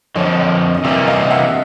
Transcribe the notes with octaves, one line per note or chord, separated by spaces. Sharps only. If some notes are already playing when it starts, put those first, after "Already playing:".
F2 D3 F3 C#5 D#5
D#5
C3 E3 G3 A#3 D5 E5
D#5 F5
E5 F#5